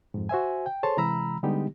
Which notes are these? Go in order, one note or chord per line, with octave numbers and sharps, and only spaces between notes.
F2 G#2
F#4 C5 E5 G#5
G5
G#4 A4 C5 C#5 A5 C6
C3 E3 G#3 A#5 B5 E6
D3 G3 G#3 B3 D#4 G4